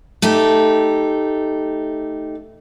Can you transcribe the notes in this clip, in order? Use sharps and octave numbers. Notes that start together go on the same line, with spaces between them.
A3 D#4 G4